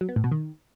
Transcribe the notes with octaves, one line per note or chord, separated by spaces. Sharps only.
F#3
B3
A2
B2
D#3